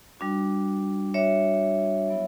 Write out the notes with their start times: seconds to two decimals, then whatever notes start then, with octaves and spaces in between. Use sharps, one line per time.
0.20 G3 D4 F#4
1.14 G3 D4 F#4 C#5 E5
2.09 F#3 B3 E4